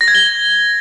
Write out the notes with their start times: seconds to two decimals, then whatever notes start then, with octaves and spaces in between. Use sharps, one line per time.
0.01 A#6
0.08 G#6
0.15 G7